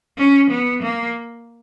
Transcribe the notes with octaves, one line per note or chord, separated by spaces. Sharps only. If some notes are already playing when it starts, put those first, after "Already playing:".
C#4
B3
A#3